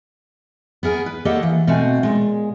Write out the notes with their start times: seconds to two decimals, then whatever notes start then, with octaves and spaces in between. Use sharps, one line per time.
0.83 B3 G#4 A#4 G#5
1.06 B4
1.25 A#3 G4 A4 C#5 D#5 F#5
1.43 E3
1.67 B2 A3 C4 F#4 G#5
2.03 A#2 G#3